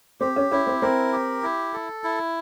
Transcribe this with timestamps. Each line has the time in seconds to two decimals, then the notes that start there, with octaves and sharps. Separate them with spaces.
0.20 C4 G4
0.36 C#4
0.52 C#4 E4
0.67 C4
0.82 C4 A#4
1.12 G4
1.43 E4
1.73 A4
2.04 E4